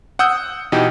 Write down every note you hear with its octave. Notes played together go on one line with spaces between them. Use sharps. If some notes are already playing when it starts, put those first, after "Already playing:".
F#5 D#6 E6 G6
B2 E3 D#4 G4